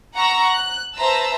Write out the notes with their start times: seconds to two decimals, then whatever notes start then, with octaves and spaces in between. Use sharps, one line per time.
0.14 F#5 A#5 C#6 E6
0.45 F#6
0.96 B4 C5 E5 A5 A#5 E6